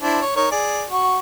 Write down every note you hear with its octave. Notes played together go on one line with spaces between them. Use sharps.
D4 E4 C5
C#5
D#4 A#4 C#5
G#4 D5
F#4 C#6